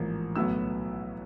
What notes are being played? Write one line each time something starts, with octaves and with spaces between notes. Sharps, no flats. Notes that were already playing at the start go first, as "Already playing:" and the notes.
Already playing: A1 G#2 F3 A#3
B1 A2 F#3 B3 E6